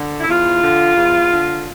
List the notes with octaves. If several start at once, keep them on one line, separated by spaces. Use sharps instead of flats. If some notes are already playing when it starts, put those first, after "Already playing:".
Already playing: D3
E4
E2 F4
D3
E2
D3